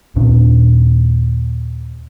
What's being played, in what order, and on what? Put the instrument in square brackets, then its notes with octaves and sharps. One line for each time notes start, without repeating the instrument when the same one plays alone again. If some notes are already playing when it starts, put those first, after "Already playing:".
[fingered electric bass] D#2 A#2 D4